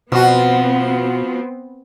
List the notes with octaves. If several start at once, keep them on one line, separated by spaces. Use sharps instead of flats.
B2 F3 B3 C4 F#4